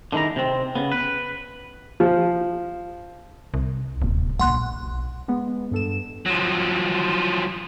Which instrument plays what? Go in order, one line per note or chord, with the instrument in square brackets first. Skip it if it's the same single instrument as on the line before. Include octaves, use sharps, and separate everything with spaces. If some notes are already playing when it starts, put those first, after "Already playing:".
[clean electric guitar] D3 D#3 G#3 E4 A#5
C3 C4
C#3 B3
B4
[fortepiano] F3
[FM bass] C2
[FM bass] D1 [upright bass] D#2 C3
[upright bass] A#1 D4 [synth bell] F#5 C6 F#6
[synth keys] B1
G#3 B3
G2 A4 E7
[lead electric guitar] F3 F#3